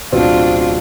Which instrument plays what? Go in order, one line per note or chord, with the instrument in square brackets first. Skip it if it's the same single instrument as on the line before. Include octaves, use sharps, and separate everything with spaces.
[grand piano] D1 B2 C4 [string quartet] D4 F4